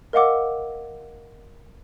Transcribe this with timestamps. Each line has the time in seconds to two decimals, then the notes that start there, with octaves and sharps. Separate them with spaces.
0.13 A#4 D#5 F5 F#5 D6 E6